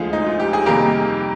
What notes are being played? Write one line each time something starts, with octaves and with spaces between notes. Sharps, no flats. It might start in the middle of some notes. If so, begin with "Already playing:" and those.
Already playing: D2 D3 F3 G#3 F4 G#4
D#4
F4
G4
G#4
F2 C3 D#3 G3 A#3 G4 A#4